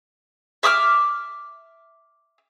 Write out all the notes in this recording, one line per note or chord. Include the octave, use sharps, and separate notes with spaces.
E5 D6 D#6 F6